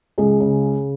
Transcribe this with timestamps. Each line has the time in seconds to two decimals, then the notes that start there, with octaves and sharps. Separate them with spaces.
0.18 C#2 G#4
0.40 C#3